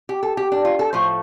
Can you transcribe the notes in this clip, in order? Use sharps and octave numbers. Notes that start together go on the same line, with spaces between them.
G4
A4
G4
D4
F4
A4
A2 F3 A3 C5